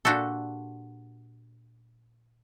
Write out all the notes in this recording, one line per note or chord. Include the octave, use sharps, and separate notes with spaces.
A#2 D4 F#4 G4 A4